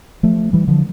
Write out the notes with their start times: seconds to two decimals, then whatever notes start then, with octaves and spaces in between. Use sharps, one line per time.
0.23 F3 A3
0.53 E3 G3
0.68 D3 F3